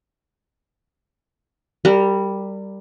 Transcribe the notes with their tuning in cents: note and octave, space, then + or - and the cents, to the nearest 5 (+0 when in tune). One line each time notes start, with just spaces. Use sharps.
G3 +0 A#4 -30